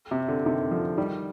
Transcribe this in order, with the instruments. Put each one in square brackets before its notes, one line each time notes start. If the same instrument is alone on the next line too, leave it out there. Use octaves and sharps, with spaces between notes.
[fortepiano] C3
D3
C3 D#3
D3 F3
D#3 G3